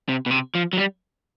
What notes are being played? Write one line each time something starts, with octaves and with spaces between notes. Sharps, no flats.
C3
B2
C3
F3
F#3
G3